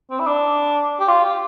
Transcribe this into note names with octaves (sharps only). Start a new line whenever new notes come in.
C4
E4
D4
G4
F4
G4